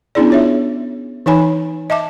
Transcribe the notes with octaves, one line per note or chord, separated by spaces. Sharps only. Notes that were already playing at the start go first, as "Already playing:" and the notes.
B3 C#4 D4 E4 G#4 D5
F4 C#5 E5
E3 D#4 C#5 G#5 B5
D#5 E5 A5 D6